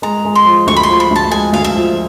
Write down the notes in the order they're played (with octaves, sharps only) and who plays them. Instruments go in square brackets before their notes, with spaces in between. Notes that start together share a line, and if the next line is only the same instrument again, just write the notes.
[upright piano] G#3 [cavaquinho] A#5
[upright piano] G#3
[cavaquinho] C6
[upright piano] F3
[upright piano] D2 [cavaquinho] C#6
[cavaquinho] B5
C6
[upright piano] F3
[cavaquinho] B5
[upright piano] D2 [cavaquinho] A5
[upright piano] G#3 [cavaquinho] G#5
[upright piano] D2 [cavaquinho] F5
[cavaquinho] E5
[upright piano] F3